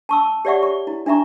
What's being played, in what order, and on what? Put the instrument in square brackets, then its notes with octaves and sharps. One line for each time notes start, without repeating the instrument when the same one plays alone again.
[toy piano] A5 C#6 E6
G4 C#5 D5 E5 F#5 C#6
C#6
E4
D4 D#4 E5 A#5 C#6